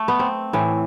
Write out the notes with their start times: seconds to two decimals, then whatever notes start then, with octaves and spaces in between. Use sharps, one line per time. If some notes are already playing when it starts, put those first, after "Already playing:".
Already playing: A3
0.08 B3
0.19 C4
0.53 A2 E3